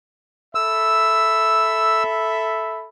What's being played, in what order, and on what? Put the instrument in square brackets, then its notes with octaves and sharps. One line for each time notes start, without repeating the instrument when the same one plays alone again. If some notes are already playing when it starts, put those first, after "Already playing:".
[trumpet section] A4 E5 B5 [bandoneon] E6